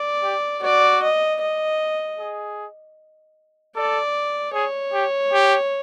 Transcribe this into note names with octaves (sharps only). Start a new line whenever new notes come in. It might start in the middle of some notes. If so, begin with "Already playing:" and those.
Already playing: D5
G4
F#4 D5
D#5
D#5
G#4
A4 D5
G#4 C#5
G4
G4